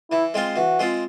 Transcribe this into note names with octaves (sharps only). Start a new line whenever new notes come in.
E3 E4
G#3 C4 F4
E3 F#4
G#3 C4 F4